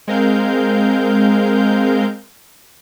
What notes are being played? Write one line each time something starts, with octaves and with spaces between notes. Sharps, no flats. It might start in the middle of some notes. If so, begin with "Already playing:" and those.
G#3 C4 A#4 F5 G6